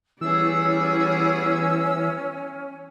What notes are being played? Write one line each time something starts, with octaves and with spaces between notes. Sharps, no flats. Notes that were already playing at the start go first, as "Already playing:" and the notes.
E3 G3 B3 C#4 G#4 E6